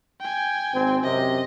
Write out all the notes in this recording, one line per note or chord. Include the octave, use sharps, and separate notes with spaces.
G5 G#5
G#1 C4
F#2 C3 D#5